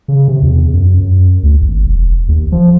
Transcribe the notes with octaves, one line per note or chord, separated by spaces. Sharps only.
C#3
C3
E2
F#2
F#2
D2
G#1
E1
D#2
F3